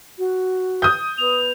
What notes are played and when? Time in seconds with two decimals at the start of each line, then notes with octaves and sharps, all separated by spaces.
0.18 F#4
0.82 D#6 G6
1.18 B3 F7